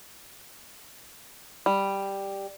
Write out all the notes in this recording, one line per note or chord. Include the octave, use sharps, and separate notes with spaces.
G3